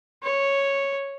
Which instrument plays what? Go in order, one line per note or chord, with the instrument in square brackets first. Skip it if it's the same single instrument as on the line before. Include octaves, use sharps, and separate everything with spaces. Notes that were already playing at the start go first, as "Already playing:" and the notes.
[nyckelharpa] C#5